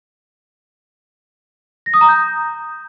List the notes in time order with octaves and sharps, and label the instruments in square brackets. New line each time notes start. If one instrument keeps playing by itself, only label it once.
[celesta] A#6
D#6
A#5
G6